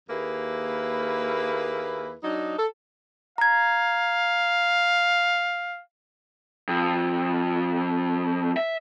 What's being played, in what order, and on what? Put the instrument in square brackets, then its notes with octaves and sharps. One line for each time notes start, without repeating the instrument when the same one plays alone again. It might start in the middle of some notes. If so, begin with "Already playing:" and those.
[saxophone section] D#2 A#3 E4 G#4 B4
F#3 D4 D#4
A4
[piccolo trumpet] F5 [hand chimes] A#5 G#6
[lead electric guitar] F2
E5